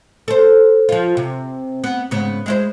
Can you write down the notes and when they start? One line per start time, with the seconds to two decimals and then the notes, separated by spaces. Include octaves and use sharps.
0.28 A4 C5
0.89 F3 F4
1.17 C3
1.84 B3
2.11 G#2 C#3 B3
2.46 G#3 E4 C5